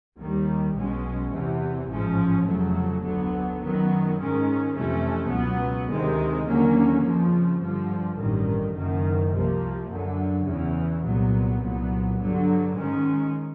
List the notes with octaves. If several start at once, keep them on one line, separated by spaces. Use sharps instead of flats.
D#2 D#3 G3
B1 B2 G#3 C#4
E2 C3 E3
A1 G#2 F3 G#3 C#4
F1 F2 C#3 F#3 A3
D2 D3 F#3 B3
F#2 D#3 F#3 B3
G#2 D#3 G#3 C#4
F2 C3 E3 A3 C#4
C#2 B2 F#3 B3
D2 C3 D#3 G#3 C4
D#2 D3 F#3 A#3 C#4
F2 C#3 F3
G2 D3 F3
A1 G2 D#3
F#1 F#2 D#3
C2 C3 F3 A#3
F#2 D3 F#3
E2 C#3 E3
C2 A#2 F#3 B3
C2 A#2 F#3 B3
G2 D3 F#3
G#2 D#3 G#3 C#4